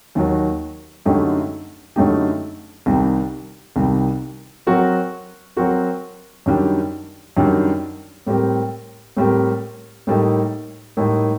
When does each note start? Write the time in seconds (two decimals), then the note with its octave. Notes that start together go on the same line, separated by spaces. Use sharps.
0.15 D#2 D#3 F#3
1.05 F#2 D3 A3 D#4 G4
1.96 F#2 D3 A3 D#4 G4
2.86 C2 C3 D#3 G3
3.76 C2 C3 D#3 G3
4.67 F#3 C4 F#4 A#4
5.57 F#3 C4 F#4 A#4
6.46 F#2 D#3 G3 D4
7.37 F#2 D#3 G3 D4
8.27 A2 G3 C4 G4 A#4
9.17 A2 G3 C4 G4 A#4
10.07 A2 G3 A#3 D#4 A4
10.97 A2 G3 A#3 D#4 A4